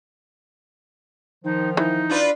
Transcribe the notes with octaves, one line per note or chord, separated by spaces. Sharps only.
D#3 F3 D#4
E3 D#4
D4 F4 B4